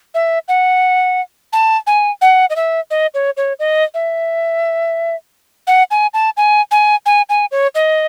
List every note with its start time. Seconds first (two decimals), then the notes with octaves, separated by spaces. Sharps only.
0.14 E5
0.48 F#5
1.53 A5
1.87 G#5
2.21 F#5
2.50 D#5
2.56 E5
2.91 D#5
3.14 C#5
3.37 C#5
3.59 D#5
3.94 E5
5.67 F#5
5.91 G#5
6.14 A5
6.37 G#5
6.71 G#5
7.06 G#5
7.29 G#5
7.51 C#5
7.75 D#5